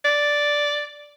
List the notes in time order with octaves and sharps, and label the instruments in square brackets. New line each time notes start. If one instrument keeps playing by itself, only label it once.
[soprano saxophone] D5